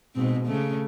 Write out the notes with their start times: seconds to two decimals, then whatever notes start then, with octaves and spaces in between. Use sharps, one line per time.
0.14 G#2 B2 C4
0.45 C#3 A3